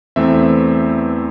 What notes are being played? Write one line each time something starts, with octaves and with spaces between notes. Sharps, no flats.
E2 E3 A3 C4 E5